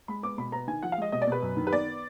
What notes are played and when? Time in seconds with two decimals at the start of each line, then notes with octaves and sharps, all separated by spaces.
0.08 G#3 B5
0.23 B3 D6
0.38 B2 B5
0.52 B3 A#5
0.68 D#3 G#5
0.83 F3 F#5
0.92 F5
0.98 G#3 D#5
1.12 B2 D#5
1.22 D5
1.27 B2 B4
1.42 F#2
1.57 D#3
1.67 B4
1.72 B3 D5